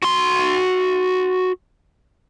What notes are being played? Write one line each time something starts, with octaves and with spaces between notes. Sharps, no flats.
F#4 C6